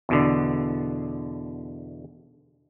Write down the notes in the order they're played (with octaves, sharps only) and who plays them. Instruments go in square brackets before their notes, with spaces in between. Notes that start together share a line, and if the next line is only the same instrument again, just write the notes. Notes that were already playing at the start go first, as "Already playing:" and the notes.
[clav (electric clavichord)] E2 B2 D3